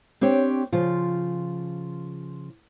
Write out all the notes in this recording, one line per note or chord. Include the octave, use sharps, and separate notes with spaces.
C4 D4 G4 C#5
C#3 F3 F4